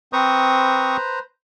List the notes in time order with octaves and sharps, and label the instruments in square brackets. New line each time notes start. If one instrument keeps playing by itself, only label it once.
[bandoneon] C4 C#6 D#6 [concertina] B4 C5 A#5